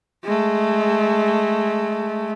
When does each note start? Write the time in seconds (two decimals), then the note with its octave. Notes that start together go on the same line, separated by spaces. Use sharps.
0.24 G#3 A3